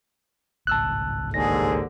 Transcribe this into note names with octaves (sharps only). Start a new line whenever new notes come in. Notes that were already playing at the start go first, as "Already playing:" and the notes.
G#1 C#2 A2 A5 E6 F#6
D#2 G#2 D3 G#4 A#6